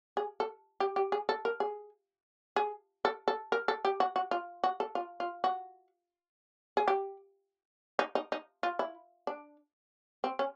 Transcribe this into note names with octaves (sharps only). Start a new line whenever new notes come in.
G#4
A4
G4
G4
G#4
A4
A#4
G#4
G#4
A4
A4
A#4
A4
G4
F#4
F#4
F4
F#4
A4
F4
F4
F#4
G#4
G4
D#4
D#4
D#4
F4
E4
D4
C4
C#4